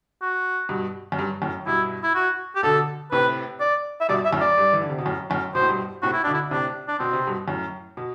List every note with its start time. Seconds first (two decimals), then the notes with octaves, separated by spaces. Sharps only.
0.21 F#4
0.69 G2 B2
1.12 F#2
1.19 G2
1.42 F#2 A2
1.67 G2 B2 E4
2.04 E4
2.15 F#4
2.56 G4
2.63 B2 D3 A4
3.12 A2 C3 B4
3.60 D5
4.01 E5
4.09 G2 B2 D5
4.25 E5
4.33 F#2 A2
4.41 D5
4.58 G2
4.73 E3
4.82 D3
4.89 C3
4.98 B2
5.05 F#2 A2
5.30 F#2 A2
5.55 B2 C5
5.61 A2
5.69 G2 B2
6.03 A2 C3 F#4
6.13 E4
6.24 B2 D3 D4
6.34 E4
6.51 A2 C3 D4
6.88 D4
6.99 B2 C4
7.13 C3
7.27 G2 B2
7.48 F#2 A2
7.97 B2